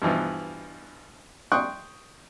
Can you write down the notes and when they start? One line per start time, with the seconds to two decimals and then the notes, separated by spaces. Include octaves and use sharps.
0.02 G2 B2 E3 F3
1.52 G5 C6 C#6 D#6 F#6